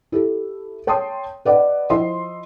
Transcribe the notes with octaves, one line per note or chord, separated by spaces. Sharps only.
E4 G4 A4
C#5 G5 A5 C6 D#6
B4 D5 D#5 F#5
F3 E4 D#5 C6